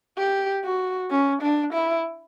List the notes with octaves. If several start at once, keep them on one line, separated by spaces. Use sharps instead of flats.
G4
F#4
C#4
D4
E4